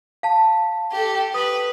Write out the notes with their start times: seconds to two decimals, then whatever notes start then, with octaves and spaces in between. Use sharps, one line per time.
0.23 F5 A5
0.92 G4 A4
1.34 B4 D#6